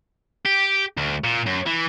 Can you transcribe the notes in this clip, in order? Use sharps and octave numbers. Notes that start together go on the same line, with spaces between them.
G4
D2
A#2
F#2
E3